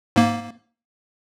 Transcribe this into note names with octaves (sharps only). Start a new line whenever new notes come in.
G#2 A#3